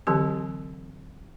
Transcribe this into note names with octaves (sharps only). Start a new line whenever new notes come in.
D3 E3 F#3 C4 G4